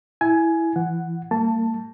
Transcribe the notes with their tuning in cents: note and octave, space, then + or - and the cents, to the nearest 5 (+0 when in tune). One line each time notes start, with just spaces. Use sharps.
E4 +0 G#5 +15
E3 +20 F#5 +0
G3 +0 A#3 -40 A5 +10